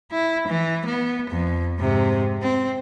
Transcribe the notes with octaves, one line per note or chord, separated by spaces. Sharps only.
E4
E3
B3
F2
G#2 C3
C4